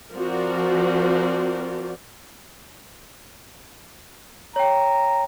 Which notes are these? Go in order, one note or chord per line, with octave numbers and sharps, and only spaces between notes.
F3 C4 F#4 A#4 D5
C#5 G5 A#5